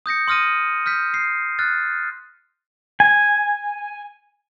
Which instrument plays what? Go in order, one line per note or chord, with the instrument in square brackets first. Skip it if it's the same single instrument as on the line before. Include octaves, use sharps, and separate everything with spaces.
[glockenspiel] D#6 G6 A#6 C#7
C6 D#6 F6 A#6 D#7
F6 G6 B6
C7
F6 F#6 A6
[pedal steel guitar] G#5